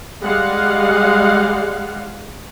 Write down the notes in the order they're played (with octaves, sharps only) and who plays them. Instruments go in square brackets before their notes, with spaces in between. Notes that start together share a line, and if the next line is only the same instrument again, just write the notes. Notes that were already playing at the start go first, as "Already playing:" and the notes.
[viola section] G3 G#3 F5 F#5